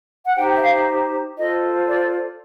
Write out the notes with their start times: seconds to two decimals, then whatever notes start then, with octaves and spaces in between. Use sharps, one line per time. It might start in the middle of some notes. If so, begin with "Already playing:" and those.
0.26 F#5
0.37 D#4 G4 C5 G5
0.56 E5
0.63 F5
1.37 F4 A4 C5 D#5
1.87 D5